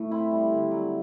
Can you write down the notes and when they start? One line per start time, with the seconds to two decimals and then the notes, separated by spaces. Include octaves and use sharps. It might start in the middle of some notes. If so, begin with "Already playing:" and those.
Already playing: A2 A3
0.11 C4 E4
0.31 G3
0.51 D3
0.71 F#3